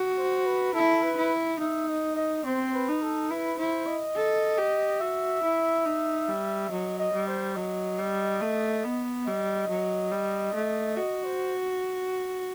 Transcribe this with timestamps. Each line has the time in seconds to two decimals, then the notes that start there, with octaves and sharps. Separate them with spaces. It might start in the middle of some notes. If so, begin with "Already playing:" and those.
Already playing: F#4
0.18 C5
0.46 B4
0.74 E4 A4
1.03 B4
1.17 E4
1.59 D#4 E5
1.88 D#5
2.16 D#5
2.45 C4 C5
2.74 B4
2.88 D#4
3.02 A4
3.30 E4 B4
3.58 E4 C5
3.87 D#5
4.15 A4
4.57 G4
5.00 F#4 E5
5.43 E4
5.86 D#4
6.28 G3
6.70 F#3 D#5
6.99 D#5
7.13 G3
7.28 C5
7.56 F#3 D#5
7.98 G3
8.41 A3
8.84 B3
9.26 G3 D#5
9.69 F#3
10.12 G3
10.54 A3
10.96 F#4 D#5
11.25 C5